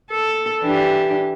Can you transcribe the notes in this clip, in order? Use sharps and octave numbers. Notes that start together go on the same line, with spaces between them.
A4
E3 D4 G4